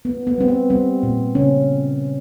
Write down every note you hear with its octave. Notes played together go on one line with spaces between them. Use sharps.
A#3 B3
B3
G3 C4
B3
G3 C4
A#2
C#3 C#4